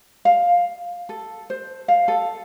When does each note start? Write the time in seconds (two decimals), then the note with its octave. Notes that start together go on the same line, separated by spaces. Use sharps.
0.25 F5
1.09 A4
1.50 C5
1.88 F5
2.08 A4